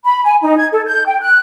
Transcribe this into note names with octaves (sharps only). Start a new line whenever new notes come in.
B5
G#5
D#4
G#6
A4
G6
G5
F#6